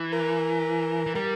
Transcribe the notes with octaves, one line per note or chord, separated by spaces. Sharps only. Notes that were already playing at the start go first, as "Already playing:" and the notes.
Already playing: E3
A#4
E3
G3 A#4